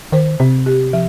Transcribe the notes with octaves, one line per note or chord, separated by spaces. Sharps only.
D#3 C5
C3 C4
G4
F3